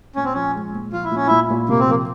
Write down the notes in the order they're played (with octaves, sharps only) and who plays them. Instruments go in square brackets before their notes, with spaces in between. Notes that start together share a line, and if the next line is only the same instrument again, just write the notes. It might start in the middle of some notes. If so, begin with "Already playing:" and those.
[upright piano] A#2 [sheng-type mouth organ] C#4
[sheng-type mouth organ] C4
[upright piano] F3 [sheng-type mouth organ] C#4
[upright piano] G#3
A#2
[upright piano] F3 [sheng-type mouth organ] F4
[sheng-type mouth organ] E4
[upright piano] A#2 [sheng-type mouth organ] C#4
[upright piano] A#2 [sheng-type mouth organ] E4
[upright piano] A#2
[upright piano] C3 [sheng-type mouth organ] A#3
[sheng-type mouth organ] C4
[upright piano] F3 [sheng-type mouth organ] A#3